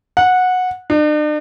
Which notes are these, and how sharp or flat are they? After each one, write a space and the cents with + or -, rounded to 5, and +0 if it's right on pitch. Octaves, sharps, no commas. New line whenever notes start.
F#5 -15
D4 +45